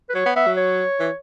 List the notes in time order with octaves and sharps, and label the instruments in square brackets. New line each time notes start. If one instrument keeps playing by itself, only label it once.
[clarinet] B4
[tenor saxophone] F#3 [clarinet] C#5
[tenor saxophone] B3
[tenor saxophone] B3 [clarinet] E5
[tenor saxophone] F#3
[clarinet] C#5
[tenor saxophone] E3